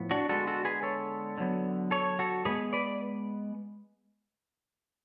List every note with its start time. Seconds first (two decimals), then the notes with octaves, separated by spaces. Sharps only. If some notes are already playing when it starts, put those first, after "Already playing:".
Already playing: A2 F3 B3
0.11 D4 F#4
0.29 D3 G#3 B3 F#4 A4
0.47 F#4 A4
0.65 G#4 B4
0.83 A4 C#5
1.38 D3 F#3 B3
1.91 A4 C#5
2.19 F#4 A4
2.45 A2 G#3 B3 G#4 B4
2.73 B4 D5